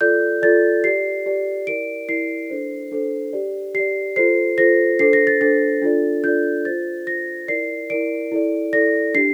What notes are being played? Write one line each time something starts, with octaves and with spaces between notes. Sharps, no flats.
F4 A4 D5 G6
F4 A4 D5 A6
G4 D5 C7
G4 D5
E4 A#4 D5 D7
E4 A#4 D5 C7
D4 A4 C5
D4 A4 C5
G4 D5
G4 D5 C7
F4 A4 C5 C7
F4 A4 C5 A#6
D4 A4 C5 C7
A#6
A6
D4 A4 C5 A6
D4 F4 A4 D5
D4 F4 A4 D5 G6
F4 C5 A6
F4 C5 A#6
E4 A#4 D5 C7
E4 A#4 D5 D7
E4 A4 D5
E4 A4 D5 A#6
D4 G4 C7